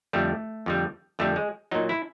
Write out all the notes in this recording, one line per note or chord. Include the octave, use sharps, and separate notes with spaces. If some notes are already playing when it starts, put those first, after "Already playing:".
F2 D3 G3 A3
F2 D3 G3
F2 D3 G3 A3
G#3
A#2 F#3 D#4
E4